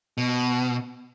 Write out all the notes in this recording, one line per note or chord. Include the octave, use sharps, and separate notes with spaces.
B2